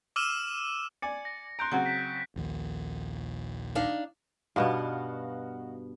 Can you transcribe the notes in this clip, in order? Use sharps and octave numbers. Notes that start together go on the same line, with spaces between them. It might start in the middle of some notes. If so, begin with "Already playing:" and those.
D6 E6 F6 D#7 E7
D5 G#5 C#7
A#6
A#5 C6 F#6 G6 D7
C#3 F#3 C4 F#5 A#5
B6
A#1 D#2 A#2
D4 D#4 F5
G2 B2 B3 D#4 F#4 F5